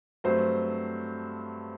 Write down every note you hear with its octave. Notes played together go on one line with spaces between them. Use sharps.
G2 F#3 A3 C4 C5